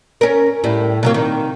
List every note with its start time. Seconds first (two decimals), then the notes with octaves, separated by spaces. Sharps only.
0.21 C#4 A#4
0.64 A2 G3
1.03 C3 F#3 A#3
1.14 D#3